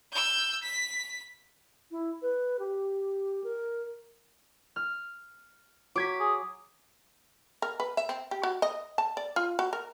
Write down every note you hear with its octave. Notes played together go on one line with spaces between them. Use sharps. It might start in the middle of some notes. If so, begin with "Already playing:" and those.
E6 G6
B6
E4
B4
G4
A#4
F6
F#3 D6 G#6 B6
G#4
A#4
B4
E5
C4
G4
F#4
D#5
A5
D5
F4
F#4
A#4